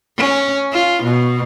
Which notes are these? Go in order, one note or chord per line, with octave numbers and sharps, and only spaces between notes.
C#4
F4
B2